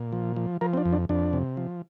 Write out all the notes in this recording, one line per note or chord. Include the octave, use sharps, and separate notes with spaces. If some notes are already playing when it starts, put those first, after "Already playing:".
Already playing: A#2
F3
F3
F3 A#4
C4
D4
F2
D4
F2 D4
C3
F3